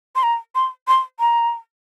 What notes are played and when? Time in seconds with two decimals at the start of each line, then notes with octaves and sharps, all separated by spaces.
0.16 C6
0.23 A#5
0.55 C6
0.88 C6
1.20 A#5